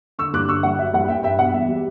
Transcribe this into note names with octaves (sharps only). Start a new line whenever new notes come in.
D3 C#6 E6
G2 D6 F#6
D3 C#6 E6
G2 F#5
F#3 E5
G2 F#5
G2 E5 G5
G2 E5 G5
B2 F#5
E2 E5
G3